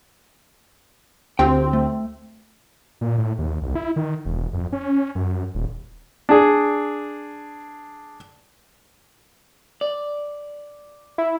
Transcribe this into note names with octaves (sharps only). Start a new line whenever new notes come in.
D2 C4 F4 G4 G5
A3
A#2
A2
D#2
C2
E4
D#3
E1
F2
C#4
F#2
D#1
D4 G#4
D5
E4